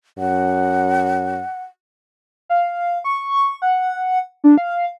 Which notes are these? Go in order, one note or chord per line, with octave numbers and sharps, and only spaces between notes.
F#2 F#5
F5
C#6
F#5
D4
F5